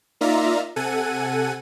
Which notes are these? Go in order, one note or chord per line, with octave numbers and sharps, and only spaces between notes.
A#3 D#4 F4 D5 E5 A#5
C3 A4 F#5 G#5 D#7